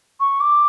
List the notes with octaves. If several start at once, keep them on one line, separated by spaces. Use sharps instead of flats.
C#6
D6